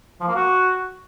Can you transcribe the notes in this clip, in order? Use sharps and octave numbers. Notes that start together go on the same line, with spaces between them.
F3
A#3
F#4